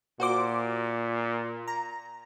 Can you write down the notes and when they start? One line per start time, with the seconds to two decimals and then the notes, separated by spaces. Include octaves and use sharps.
0.20 A#2 F#4 C5 D6
1.68 A#5